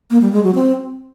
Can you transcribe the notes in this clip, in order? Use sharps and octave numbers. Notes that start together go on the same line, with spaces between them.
A#3
G3
G#3
F#3
C4